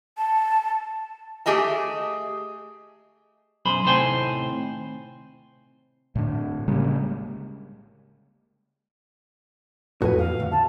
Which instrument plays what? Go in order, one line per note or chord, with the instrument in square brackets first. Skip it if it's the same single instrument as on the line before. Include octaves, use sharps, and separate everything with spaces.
[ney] A5
[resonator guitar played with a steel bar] A3 G4 G#4 D#5 A5
[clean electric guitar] B1 F#2 G#4 C5 B5
D#2 A2 C3 C5 G5 G#5
[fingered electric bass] A2 D3
C#3 G3 G#3 A#3
[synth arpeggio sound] F2 A2 [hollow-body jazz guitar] F#4 G#5 [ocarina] B4
[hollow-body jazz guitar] D#2 [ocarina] F5
[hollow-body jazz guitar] D2
[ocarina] A5